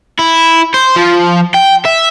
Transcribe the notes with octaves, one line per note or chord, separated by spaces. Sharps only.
E4
C5
F3
G5
E5